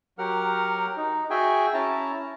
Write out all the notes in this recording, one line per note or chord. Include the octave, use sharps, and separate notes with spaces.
F#3 G4 A#4 F#5 F6
D#4
F#4 G#4 E5 G5 G#5
C#4 E4 A5 A#5